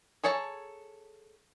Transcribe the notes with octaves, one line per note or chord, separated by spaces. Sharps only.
G#4 A4 C#5 A5 A#5